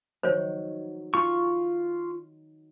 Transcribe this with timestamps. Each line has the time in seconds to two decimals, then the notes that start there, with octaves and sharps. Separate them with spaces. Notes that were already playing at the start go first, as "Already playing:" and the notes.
0.23 D#3 F#3 C5 C#5
1.14 F4 C#6